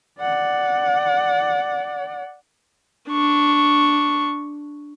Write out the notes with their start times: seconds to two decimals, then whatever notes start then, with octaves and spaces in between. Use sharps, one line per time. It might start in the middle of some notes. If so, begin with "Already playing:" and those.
0.20 D5 F#5
3.09 D4 C#6